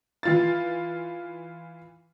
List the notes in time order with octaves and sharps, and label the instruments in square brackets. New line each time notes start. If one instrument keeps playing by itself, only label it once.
[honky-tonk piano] E3 F4 A6